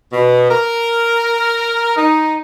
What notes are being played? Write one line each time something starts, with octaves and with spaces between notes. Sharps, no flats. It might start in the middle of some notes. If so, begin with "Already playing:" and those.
B2
A#4
D#4